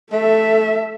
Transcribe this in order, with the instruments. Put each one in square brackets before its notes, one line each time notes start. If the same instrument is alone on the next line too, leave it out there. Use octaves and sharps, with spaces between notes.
[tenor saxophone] A3 [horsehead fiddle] A4 E5